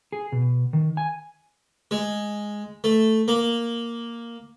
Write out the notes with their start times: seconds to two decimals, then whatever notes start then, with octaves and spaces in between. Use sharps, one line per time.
0.12 G#4
0.32 B2
0.73 D#3
0.97 G#5
1.91 G#3
2.84 A3
3.28 A#3